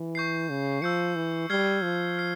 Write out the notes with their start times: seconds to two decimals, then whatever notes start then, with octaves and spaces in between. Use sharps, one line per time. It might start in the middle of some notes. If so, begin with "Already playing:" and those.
Already playing: E3
0.15 C#6 G6 C7
0.50 C#3
0.82 F3 E6 G6 C#7
1.15 E3
1.50 G3 F6 G#6 C7 G7
1.83 F3
2.17 F6 C7